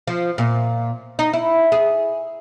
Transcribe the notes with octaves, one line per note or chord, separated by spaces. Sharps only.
F3
A#2
D#4
E4
G#4